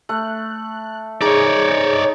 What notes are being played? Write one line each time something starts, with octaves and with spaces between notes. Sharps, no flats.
A3 F#6
D#4 G#4 C#5 D5